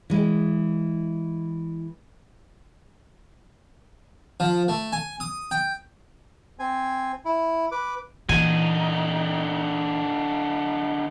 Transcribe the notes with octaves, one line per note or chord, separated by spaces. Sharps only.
E3 G#3
F3
A3
G#5
D#6
G5
C4 G#5
E4
B4 D6
A#2 D3 E3 D#4 G#5